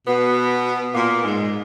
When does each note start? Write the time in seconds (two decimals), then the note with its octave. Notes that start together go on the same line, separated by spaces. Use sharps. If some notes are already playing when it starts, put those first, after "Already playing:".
0.07 B2 B3
0.94 A#2 A#3
1.23 G#2 G#3